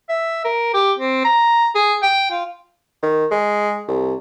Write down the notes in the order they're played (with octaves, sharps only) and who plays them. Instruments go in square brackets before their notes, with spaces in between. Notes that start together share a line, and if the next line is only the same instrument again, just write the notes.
[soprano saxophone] E5
A#4
G4
C4
A#5
G#4
G5
F4
[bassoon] D#3
G#3
C2